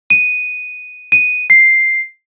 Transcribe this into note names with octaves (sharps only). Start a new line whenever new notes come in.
D#7
D#7
C7